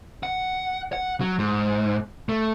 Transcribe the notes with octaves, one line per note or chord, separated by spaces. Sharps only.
F#5
F#5
F#3
G#2
A3